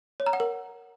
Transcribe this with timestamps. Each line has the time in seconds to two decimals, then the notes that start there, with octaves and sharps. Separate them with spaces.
0.20 C#5
0.26 A#5
0.33 F#5
0.40 A#4